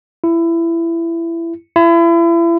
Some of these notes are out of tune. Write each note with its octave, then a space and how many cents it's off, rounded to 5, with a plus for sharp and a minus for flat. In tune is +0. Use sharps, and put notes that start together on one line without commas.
E4 +20
E4 +35